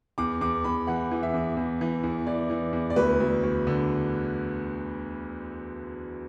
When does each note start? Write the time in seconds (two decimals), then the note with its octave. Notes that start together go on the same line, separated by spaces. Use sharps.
0.18 E2 D6
0.41 E2 D6
0.64 E2 B5
0.87 E3 F#5
1.11 E3
1.23 E5
1.34 E2
1.57 E2
1.81 E3
2.03 E2
2.27 E3 D5
2.50 E3
2.73 E2
2.90 D5
2.96 D2 B4
3.20 D2
3.43 D2
3.67 D3